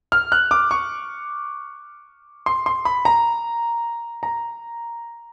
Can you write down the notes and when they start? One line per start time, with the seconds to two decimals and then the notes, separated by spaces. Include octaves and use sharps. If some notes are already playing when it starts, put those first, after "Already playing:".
0.12 F6
0.32 F#6
0.51 D6
0.71 C#6
2.46 C6
2.66 C6
2.85 B5
3.05 A#5
4.23 A#5